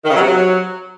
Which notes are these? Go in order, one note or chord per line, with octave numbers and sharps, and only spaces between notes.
D#3
C#3
F#3
C3
F#3